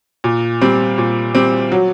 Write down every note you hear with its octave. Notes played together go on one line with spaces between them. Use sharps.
A#2
G3 C4
A#2
G3 C4
F#3